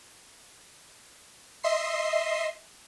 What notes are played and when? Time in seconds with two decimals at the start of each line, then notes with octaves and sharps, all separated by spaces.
1.64 D#5 E5 C6 C7